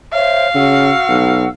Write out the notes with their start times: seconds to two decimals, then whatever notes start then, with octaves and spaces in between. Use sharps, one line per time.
0.13 C5 C#5 E5 F5
0.54 C#3 F#4 F#5 E6
1.09 B1